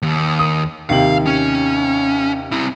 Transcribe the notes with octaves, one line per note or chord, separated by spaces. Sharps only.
D#2
D#6
D#2 C3 F5 F#7
C#4
C4 E4